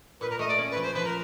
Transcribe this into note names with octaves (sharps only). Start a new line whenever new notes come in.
A#2 B4
A#4
A3 D#5
D5
C#4
B4
F3
C5
F3 B4
A#4